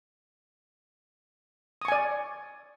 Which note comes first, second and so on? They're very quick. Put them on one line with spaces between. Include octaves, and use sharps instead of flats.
D#6 C#6 G#5 D5